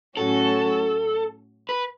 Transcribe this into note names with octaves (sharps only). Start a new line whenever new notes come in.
A2 F#3 C#4 F#4 A4
B4